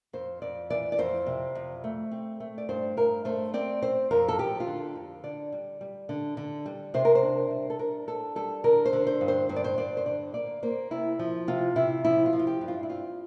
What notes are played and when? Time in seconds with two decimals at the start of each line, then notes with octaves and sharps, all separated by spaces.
0.13 F2 C5
0.42 F2 D5
0.70 E3 D5
0.92 D5
0.98 F2 C5
1.27 C3
1.55 F2
1.84 A3
2.12 C4
2.40 A3
2.58 D5
2.69 G2 C5
2.97 G2 A#4
3.25 A3 C5
3.54 C4 D5
3.82 C4 C5
4.11 F2 A#4
4.28 A4
4.39 F3 G4
4.60 F4
4.67 D3
4.96 F2
5.24 D3 D5
5.52 G3
5.81 G3
6.09 D3
6.37 D3
6.66 G3
6.94 C3 C5
7.05 A#4
7.15 C5
7.23 D4
7.51 G3
7.70 A4
7.79 D4 A#4
8.07 D4 A4
8.36 G3 A4
8.64 D3 A#4
8.86 C5
8.93 D3
9.07 C5
9.21 G2
9.28 C5
9.49 G2 C5
9.56 D5
9.64 C5
9.78 G2 D5
9.97 C5
10.06 D3 D5
10.34 A#3 D5
10.63 A#3 C5
10.91 C3 E4
11.19 F3
11.48 C3 F4
11.76 C3 E4
12.05 F3 E4
12.26 F4
12.33 F3
12.39 F4
12.47 G4
12.61 G2
12.68 F4
12.83 E4
12.89 C4 F4